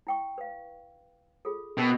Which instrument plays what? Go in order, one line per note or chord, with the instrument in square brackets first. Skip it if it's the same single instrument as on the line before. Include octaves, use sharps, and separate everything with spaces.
[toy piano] E4 G5 C#6
B4 F5
F4 G#4 A4
[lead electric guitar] B2 [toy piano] C#4 A#4 A5